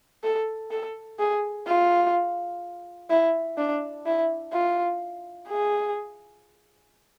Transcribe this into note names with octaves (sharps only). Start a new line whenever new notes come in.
A4
A4
G#4
F4
E4
D4
E4
F4
G#4